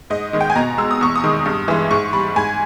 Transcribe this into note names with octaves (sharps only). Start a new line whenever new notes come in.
G#2 D#5
D#3 G#3
G5
G#5
B2 A#5
G#3 E6
D#6
E2 C#6
D#6
D#3 G#3
G2
E3 G#3
G#2 C#6
G3 B5
G#2 G#5